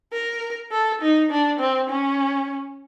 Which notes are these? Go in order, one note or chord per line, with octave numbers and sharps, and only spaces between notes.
A#4
A4
D#4
D4
C4
C#4